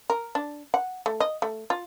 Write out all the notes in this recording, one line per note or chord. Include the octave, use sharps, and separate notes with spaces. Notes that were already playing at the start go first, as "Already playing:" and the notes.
A#4
D4
F#5
A3
D#5
A3
F4